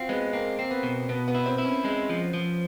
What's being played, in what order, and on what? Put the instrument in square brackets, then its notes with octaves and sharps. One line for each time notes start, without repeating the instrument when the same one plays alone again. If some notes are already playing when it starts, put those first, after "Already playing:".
Already playing: [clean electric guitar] C4 [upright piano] F4 F#4
[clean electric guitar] G#3 [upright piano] B3
[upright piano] A#3 [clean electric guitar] C4
[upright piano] A#3 [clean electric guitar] C4
[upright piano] B3
[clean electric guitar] B2
[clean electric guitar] B2 [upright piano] B3
[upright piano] B3
[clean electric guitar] E4
[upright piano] C4
[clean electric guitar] E4
[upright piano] C#4
[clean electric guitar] G#3
F3
F3